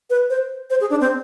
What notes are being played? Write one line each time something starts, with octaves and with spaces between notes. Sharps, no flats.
B4
C5
C5
G#4
D4
C4